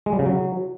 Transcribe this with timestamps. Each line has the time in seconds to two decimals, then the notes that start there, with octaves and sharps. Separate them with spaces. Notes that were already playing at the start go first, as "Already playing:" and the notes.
0.06 G#3
0.13 G3
0.19 C#3
0.26 F#3